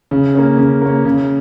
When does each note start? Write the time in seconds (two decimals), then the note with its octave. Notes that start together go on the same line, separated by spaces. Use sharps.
0.11 C#3
0.35 A#3 C#4
0.58 C#3
0.82 A#3 C#4
1.05 C#3